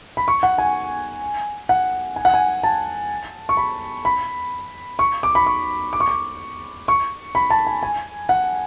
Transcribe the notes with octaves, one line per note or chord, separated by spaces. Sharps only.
B5
C#6
F#5
G#5
F#5
G#5
F#5
G#5
A5
C#6
B5
B5
C#6
D6
B5
C#6
D6
C#6
D6
C#6
B5
A5
G#5
G#5
F#5